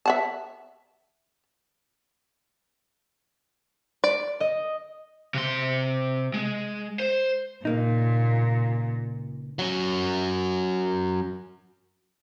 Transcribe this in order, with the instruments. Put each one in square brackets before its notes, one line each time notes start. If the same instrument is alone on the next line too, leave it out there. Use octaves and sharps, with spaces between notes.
[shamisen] E5 F#5 A5
[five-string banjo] D5
[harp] D#5
[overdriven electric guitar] C3 C6
G#3
C5
[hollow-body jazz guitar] C#2 A#3 D#4 [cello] A#2
[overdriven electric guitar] F#3 C#4